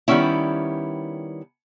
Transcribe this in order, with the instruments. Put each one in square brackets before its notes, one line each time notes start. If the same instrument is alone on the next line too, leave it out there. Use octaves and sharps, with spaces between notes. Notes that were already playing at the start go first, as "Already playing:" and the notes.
[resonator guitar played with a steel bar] D#3 G3 B3 C#4 E4